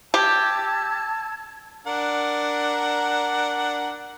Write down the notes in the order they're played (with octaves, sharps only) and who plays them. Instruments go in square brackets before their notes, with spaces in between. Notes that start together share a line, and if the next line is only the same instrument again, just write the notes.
[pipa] G4 [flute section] A5 E6 G#6
[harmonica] D4 A#4 F#5